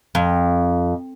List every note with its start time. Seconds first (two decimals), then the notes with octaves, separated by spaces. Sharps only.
0.15 F2